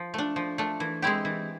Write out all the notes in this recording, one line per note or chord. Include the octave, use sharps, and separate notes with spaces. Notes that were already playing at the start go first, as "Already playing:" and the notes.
Already playing: F3
A3 D4
F3
A3 D4
E3
G#3 C4 E4 G4
E3